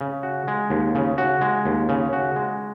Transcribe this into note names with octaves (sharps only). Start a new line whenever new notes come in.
C#3
F#4
G#3
D#2
C#3
F#4
G#3
D#2
C#3
F#4
G#3